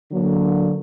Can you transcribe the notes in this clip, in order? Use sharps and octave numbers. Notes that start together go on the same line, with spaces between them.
D3 F#3 A#3